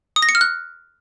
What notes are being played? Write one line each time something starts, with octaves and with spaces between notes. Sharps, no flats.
D#6
A#6
C#7
F6
F#6